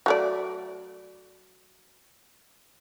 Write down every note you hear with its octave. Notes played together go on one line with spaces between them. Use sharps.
F#3 A3 D5